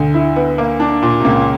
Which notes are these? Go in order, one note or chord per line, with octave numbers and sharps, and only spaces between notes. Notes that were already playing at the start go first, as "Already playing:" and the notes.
Already playing: D2 D3
E4
B3
A#3
D4
A#2
C3
C#2 C#3 A#3